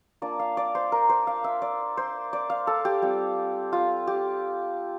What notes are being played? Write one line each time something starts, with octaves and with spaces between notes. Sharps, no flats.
A#3 D4 F4 D5
F5
D5
C5
A#4
C5
F5
E5
D5
C5
D5
F5
A4
G4
G3 C4 F4
F4
G4